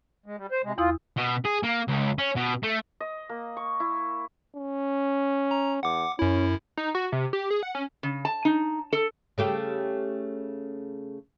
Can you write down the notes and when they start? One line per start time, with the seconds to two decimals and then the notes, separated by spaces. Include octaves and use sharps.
0.26 G#3
0.38 G3
0.51 C5
0.64 C3 G#3
0.78 E2 E4 F4 D#6
1.17 B2
1.45 G#4
1.64 A#3
1.88 C#2
2.18 C#4
2.36 B2
2.63 A3
3.00 D#5
3.29 A#3
3.57 C#6
3.80 E4
4.56 C#4
5.51 A#5
5.83 E2 F#5 D6
6.19 F#2 C#4 E4
6.77 D#4
6.95 F#4
7.12 C3
7.33 G4
7.50 G#4
7.63 F#5
7.75 C#4
8.03 C#3
8.25 A5
8.45 D#4
8.93 A4
9.38 C#3 A3 G4